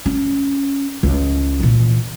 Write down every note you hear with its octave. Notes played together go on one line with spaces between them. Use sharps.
C#4
C#2
A#2 E3